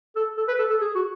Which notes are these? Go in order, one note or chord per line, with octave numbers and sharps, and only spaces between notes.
A4
A4
B4
A4
A4
G#4
F#4